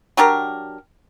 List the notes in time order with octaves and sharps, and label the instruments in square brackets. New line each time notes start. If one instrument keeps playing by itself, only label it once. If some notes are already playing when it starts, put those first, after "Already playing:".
[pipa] F#3 D4 G4 A#4